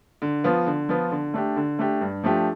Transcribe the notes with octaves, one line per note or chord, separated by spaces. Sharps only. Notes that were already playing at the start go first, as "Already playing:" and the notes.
D3
F3 B3 F4
D3
F3 B3 F4
D3
A3 D4 G4
D3
A3 D4 G4
G2
F3 A3 D4 G4